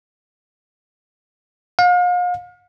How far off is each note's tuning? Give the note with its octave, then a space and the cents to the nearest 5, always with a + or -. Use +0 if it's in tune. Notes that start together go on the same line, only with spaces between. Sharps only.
F5 +40